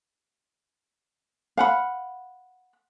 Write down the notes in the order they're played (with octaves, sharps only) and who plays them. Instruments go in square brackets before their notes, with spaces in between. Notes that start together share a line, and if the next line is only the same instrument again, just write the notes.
[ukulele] F5 F#5 B5